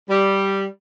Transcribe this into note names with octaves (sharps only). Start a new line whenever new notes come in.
G3